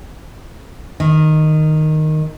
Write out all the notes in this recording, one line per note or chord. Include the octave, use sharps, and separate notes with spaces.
D#3